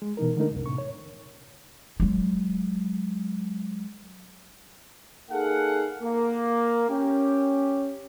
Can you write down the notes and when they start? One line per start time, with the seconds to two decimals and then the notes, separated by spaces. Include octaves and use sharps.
0.02 G#3
0.17 B2 E3 D#4 A#4
0.37 D3 G#3 A3 D4 D#4 A#4
0.51 C2 F#2
0.66 A2 C3 C#6
0.78 C#5
2.00 F#3 G#3
5.31 A#3 D#4 G#4 A4 F5 F#5
6.02 A#3
6.90 C#4 G4